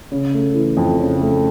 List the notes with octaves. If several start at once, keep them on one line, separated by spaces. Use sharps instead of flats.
C#3
A3
E3
F2
C#3
A3